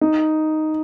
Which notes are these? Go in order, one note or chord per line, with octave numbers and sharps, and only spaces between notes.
D#4